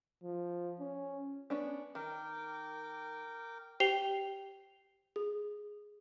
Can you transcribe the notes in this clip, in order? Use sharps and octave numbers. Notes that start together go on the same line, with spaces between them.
F3
C#4
B3 C#4 D4
D#3 A#4 G5 D6
G4 C5 G5 C7 F7 G7
G#4